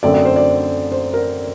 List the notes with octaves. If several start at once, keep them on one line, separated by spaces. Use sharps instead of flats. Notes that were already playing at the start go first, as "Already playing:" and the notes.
F#2 D3 A3 C4 D5
D5
C5
D5
C5
A#4